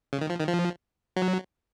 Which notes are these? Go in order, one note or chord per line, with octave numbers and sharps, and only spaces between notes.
C#3
D#3
F3
D#3
F3
F#3